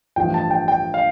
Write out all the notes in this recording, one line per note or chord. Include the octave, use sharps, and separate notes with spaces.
A1 G2 F3 A3 G5
A5
G5
G5
F5